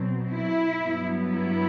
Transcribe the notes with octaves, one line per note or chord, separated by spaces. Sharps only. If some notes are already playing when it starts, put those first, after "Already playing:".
Already playing: B2 F#3 C4
E4
G2 F#3 B3
E4